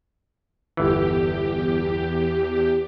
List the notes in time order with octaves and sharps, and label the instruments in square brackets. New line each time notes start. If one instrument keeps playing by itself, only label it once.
[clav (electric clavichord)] G1 E3 [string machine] E2 G4